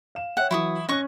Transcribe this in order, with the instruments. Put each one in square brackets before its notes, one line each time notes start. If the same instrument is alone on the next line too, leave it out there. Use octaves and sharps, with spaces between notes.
[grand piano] F5 E7
[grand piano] C#5 E5 G5 [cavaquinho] F#5
[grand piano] E3 F#3 [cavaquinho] E4 C#6 D#6
[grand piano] C#4 F#6 [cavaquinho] D#5 C#6